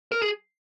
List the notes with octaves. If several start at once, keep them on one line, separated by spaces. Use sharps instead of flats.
A#4
G#4